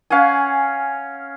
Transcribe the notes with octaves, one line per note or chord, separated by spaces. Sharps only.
C#4 F5 F#5 G#5